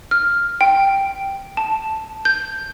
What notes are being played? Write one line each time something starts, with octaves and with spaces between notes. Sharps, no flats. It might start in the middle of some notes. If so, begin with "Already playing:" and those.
F6
G5
A5
G6